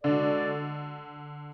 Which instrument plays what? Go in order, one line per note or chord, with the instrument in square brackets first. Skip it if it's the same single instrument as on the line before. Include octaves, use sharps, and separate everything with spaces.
[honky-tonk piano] D3 [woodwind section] G#3 D4 F#4 A4 D5